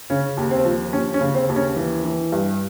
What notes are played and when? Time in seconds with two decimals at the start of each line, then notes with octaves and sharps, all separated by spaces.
0.10 C#3 C#4
0.37 D#2
0.51 C4
0.65 F3
0.93 D#2 C#4
1.14 C#4
1.21 C#3
1.35 C4
1.49 D#2
1.56 C#4
1.76 E3
2.05 E3
2.32 G2